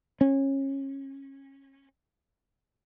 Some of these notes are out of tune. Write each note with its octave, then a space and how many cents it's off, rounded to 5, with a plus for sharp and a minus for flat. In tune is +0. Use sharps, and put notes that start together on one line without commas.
C#4 -25